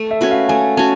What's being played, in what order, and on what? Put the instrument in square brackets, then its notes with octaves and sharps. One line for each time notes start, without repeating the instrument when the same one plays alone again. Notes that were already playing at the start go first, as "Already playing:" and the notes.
Already playing: [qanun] A3
[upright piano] E5
[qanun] C#4 F#4 B4
[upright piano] F5
[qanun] A3 [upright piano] G#5
[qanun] C#4 F#4 [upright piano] A5